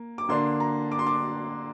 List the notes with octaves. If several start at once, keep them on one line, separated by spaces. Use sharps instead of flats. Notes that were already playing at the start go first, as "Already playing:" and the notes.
Already playing: A#3
D6
D3 A#3 D4 C6
A#5
D6
C6
D6